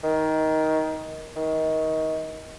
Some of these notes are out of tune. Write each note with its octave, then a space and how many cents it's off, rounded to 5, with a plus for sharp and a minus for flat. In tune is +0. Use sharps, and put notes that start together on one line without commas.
D#3 +15
D#3 +25